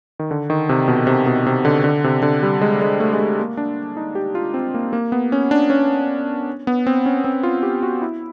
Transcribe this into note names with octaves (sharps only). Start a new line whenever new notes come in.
D#3
D3
D#3
C3
B2
C3
B2
C3
D3
D3
C3
D3
G3
G#3
G#3
A3
G#3
A3
A#3
D4
D#4
G4
F4
C4
A#3
A#3
B3
C#4
D4
C#4
B3
C4
C#4
C4
F4
G4
F#4
E4